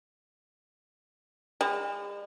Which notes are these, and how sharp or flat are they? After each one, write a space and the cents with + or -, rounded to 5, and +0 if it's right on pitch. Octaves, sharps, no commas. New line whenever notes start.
G#3 -45